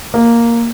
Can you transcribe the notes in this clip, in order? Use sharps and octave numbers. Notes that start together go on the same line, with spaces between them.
A#3